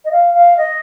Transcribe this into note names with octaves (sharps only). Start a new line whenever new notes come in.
D#5
F5
F5
D#5